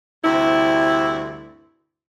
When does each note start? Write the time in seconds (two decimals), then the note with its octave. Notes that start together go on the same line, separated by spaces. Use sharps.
0.24 D2 G2 C3 E4